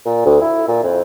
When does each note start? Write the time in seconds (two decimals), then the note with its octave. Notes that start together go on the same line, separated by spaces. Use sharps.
0.05 A#2
0.26 D2
0.42 E4
0.68 A#2
0.83 F2